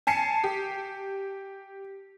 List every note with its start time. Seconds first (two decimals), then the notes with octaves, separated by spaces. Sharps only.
0.07 G#5 A5 C7 C#7
0.44 G4